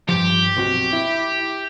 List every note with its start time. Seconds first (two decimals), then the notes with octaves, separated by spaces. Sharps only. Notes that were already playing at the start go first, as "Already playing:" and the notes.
0.09 G2 F3 G4
0.56 B1 C4 F#4
0.92 E4